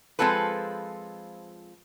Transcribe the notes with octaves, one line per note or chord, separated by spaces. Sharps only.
F3 G#3 C4 F4 A4 B4